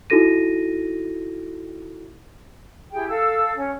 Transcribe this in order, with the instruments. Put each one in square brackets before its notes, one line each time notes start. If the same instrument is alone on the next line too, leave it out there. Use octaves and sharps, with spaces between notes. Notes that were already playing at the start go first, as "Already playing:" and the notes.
[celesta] D#4 E4 F#4 A4 A#6 D#7
[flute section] E4 G4 G#4 G5
A4 F5 E6
C#4